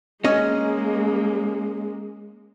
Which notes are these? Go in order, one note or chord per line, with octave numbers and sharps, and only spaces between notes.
G#3 A#3 C#4 D#5